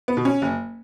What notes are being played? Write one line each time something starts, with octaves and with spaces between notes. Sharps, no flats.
B3
B2
C#4
F#1